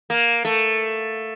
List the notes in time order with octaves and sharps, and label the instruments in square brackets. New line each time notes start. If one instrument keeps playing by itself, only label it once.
[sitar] A#3
A3